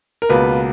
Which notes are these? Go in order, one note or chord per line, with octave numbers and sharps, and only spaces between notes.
A#4
C#2 B2 A#3 B4